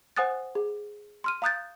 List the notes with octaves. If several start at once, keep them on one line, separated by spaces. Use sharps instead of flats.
C5 F#5 G#5 D#6 F#6 A6
G#4
C6 F6 D#7
F5 A#5 D#6 F#6 G6 A6